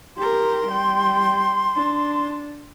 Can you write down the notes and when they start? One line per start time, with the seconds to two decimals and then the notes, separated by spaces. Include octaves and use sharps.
0.17 G4 A#4 C6
0.67 G3 G5
1.75 D4